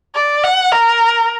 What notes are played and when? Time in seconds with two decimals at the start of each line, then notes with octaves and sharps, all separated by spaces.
0.15 D5
0.43 F#5
0.72 A#4